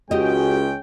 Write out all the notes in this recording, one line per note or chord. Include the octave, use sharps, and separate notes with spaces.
C#2 G#3 C#4 F#4 G4 D#5 G5